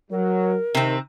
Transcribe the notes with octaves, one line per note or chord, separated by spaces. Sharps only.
F#3 A#4
C3 D#3 C4